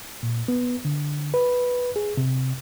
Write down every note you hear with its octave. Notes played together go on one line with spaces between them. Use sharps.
A#2
B3
D3
B4
G#4
C3